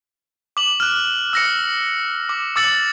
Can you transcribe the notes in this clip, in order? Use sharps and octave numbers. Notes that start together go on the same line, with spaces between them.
D6 F#7
F6 F#6
E6 A#6 C#7
D6
D6 E6 A6 C#7 F#7